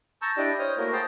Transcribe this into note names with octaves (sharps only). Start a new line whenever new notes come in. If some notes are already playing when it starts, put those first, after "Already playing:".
A5 A#5 C#6 E6 G6
D4 E4 G4 D5 D#5
C5 C#5 D#6 F6 G6
A3 A#3 E4 F#4 A#4
G#4 C5 G5 A5 A#5 C6